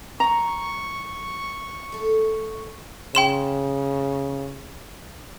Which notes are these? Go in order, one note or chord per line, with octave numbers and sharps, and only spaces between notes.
F#2 D#3 A#5 C#6
A3 A4
C#3 G5 C6 E7